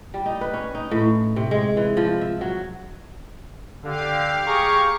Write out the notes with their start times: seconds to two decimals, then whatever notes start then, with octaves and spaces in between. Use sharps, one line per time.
0.14 G3
0.26 D#4
0.41 B4
0.53 C#4
0.75 D#4
0.91 A2
1.36 C3
1.51 G#3
1.77 E3
1.97 F3
2.21 E5
2.41 F#3
3.84 D3 G4 F5
4.48 G#4 A#5 C#6